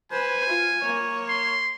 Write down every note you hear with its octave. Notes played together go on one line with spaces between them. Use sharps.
B4 C5 G#5
F4
A#3 C#5
C6